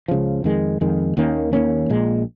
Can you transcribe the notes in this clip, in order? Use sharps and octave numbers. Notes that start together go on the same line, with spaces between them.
C#2 C#3 F3
F2 D#3 G#3
F2 D#3 G#3
D#2 D#3 A#3 C#4
D#2 D#3 A#3 C#4
A#1 A#2 G#3